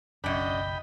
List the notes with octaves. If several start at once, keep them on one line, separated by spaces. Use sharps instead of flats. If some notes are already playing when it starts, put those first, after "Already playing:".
F#1 B1 F#2 D4 D#5 G5 B5